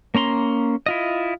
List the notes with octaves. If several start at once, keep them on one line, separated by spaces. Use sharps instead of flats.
A#3 C#4 A#5 C6
E4 F4 D#5